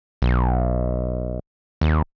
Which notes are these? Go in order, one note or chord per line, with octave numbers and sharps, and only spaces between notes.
B1
D#2